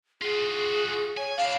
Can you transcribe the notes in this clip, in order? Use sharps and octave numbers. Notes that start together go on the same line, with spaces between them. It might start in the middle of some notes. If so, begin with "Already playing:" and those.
F4 F#4 G#4
C#5 G#5
D4 E4 F5